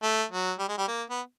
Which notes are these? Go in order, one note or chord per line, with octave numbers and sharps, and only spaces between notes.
A3
F#3
G3
G#3
G3
A#3
B3